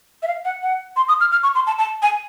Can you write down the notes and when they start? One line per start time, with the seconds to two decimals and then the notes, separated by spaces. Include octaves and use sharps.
0.23 E5
0.27 F5
0.45 F#5
0.62 F#5
0.96 C6
1.08 D#6
1.21 F6
1.32 F6
1.43 C#6
1.55 C6
1.67 A5
1.79 A5
2.02 G#5